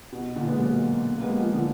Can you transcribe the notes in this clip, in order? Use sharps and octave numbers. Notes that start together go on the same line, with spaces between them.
B2
A#2 D3
G#3 B3
F#3 A#3
A#3
G#3 B3
F3 G#3
D3 F3